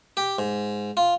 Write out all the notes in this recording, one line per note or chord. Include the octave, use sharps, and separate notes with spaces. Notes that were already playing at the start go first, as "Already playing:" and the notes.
G4
G#2
F4